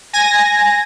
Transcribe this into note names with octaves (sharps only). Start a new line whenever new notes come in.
G#5 A#6